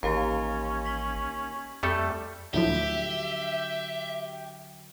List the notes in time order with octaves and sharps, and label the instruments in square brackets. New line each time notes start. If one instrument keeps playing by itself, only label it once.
[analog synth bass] A1 [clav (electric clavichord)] D#2 [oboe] C#4 [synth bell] G4 F5 A#5
[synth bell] B6 F#7 G7
[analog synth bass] F2 [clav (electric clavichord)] G3 A3 A4
[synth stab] D2 A2 F3 [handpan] D3 F#3 [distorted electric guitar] G4 [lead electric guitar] E5